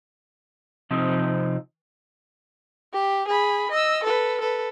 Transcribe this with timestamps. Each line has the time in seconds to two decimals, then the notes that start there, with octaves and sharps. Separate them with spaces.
0.91 C3 F3 C4 D#4
2.93 G4
3.28 G#4 B5
3.71 D#5 E6
4.04 A4 B4
4.41 A4 B4